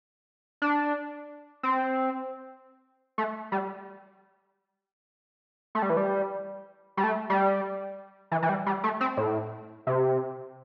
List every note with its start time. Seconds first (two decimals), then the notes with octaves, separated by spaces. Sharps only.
0.62 D4
1.63 C4
3.18 A3
3.52 G3
5.75 A3
5.82 G3
5.90 E3
5.97 G3
6.97 G3
7.04 A3
7.30 G3
8.31 E3
8.42 E3
8.49 G3
8.66 G3
8.84 A3
9.01 C4
9.17 A2
9.87 C3